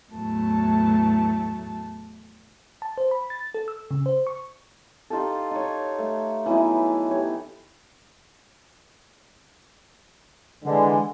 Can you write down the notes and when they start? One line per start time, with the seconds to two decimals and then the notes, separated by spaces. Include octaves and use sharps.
0.12 E2 A2 F#3 A3 A5
2.82 A5
2.98 C5
3.11 B5
3.30 A6
3.54 A4
3.68 E6
3.91 C#3
4.06 C5
4.27 C#6
5.10 D#4 F4 G4 A4
5.51 D#4 C#5
5.99 A3
6.46 E3 F#3 B3 D#4
7.10 G4 C#5
10.64 D3 E3 G#3